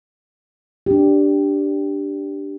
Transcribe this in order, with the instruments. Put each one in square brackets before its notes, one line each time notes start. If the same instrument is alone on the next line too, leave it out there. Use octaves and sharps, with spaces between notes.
[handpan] D4 G4